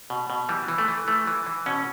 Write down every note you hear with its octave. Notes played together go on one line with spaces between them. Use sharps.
B2
B2
E3 G3
E3
A3
E3
E3 A3
E3
E3
B2 C#4